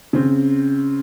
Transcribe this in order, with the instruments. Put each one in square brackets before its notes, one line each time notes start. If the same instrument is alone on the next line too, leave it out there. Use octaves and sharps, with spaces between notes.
[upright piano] C#3 C4